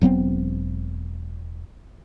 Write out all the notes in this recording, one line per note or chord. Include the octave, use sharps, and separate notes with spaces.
E1 F#3 B3 C4